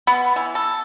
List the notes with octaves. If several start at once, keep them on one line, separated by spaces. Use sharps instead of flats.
B3
E3
A4